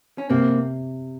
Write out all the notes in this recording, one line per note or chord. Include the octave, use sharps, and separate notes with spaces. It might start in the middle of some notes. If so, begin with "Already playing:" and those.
C#4
C3 A#3 C4